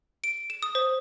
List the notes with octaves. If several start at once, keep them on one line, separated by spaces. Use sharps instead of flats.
D7
E7
D#6
C5